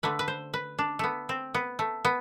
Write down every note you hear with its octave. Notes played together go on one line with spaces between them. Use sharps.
D3 A3 B4
B4
C5
B4
D4
A3 B3
C4
B3
A3
B3